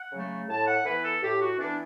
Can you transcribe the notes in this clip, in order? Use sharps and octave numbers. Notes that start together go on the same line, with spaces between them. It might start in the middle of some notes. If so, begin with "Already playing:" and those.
Already playing: F#5
C#3 F#3 A3
A2 A5
F#5
E3 B3 B4
A4
A2 G4
F#4
E3 B3 D4